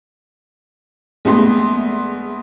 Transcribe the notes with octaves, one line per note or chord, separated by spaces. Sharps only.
A#1 G#3 A3 B3 C6